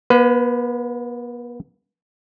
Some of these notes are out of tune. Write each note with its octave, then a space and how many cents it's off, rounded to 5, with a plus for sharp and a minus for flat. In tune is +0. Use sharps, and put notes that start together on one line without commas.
B3 -45 B4 +20